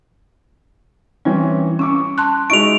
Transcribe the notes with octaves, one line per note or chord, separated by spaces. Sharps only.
E3 G3 C4 C#4
C#4 C#6 D6 E6
A5 C6 F#6
G#3 D#4 E4 C#6 D7 F7